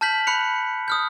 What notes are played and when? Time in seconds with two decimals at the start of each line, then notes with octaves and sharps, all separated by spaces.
0.01 A5 F6 G6 B6 F#7
0.27 B5 F#6 C#7 F7
0.88 D#6 F6 G6